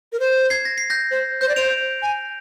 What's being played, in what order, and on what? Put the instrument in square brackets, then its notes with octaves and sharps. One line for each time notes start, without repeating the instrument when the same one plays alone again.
[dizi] A#4
C5
[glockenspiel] G#6 C7
A#6
C7
G6 A#6
[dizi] C5
[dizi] C5 [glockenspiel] G6
[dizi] D5
[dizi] C5 [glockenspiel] D7 F7
[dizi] G#5